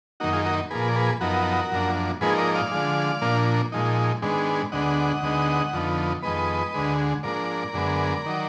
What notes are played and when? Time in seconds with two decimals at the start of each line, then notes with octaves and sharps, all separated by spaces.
0.20 F#2 D#3 A#3 D#4 F#4
0.33 F4 G#4
0.46 F#4 A#4
0.70 A#2 F3 A#3 G#4 B4
0.88 D5
0.95 G#4 B4
1.21 F#2 F3 B3 D#4 F#4 A#4
1.71 F#2 F3 A#3 D4
2.21 G#2 F3 A#3 D#4 G#4 B4
2.38 A#4 D5
2.54 D5 F5
2.71 D3 F3 G#3
3.22 A#2 F3 A#3 D4
3.72 A#2 F3 G#3 D#4
4.22 G#2 D#3 G#3 B3 D4
4.72 D2 D3 G#3 B3 D4 D#5 F#5
5.22 D2 D3 G#3 B3 D#4
5.73 F2 D3 F3 B3 D#4
6.23 F2 D#3 G#3 B3 B4 D#5
6.74 D2 D3 G#3
7.23 G#2 F3 A#3 D4 A#4 D5
7.74 F#2 D3 G#3 B3
8.26 D#3 F#3